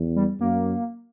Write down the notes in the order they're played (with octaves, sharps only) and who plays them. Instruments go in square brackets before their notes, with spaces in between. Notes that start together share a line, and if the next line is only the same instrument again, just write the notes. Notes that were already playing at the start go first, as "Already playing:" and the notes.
Already playing: [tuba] E2
[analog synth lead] G3
[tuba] F#2 [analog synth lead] A#3